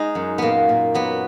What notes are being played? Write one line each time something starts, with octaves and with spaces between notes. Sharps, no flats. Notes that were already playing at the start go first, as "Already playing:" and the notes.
Already playing: G#3 D#4
F#2
A#2 A#3 B3
A#2
F#3 B3